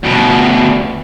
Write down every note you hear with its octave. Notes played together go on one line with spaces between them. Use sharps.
D2 B2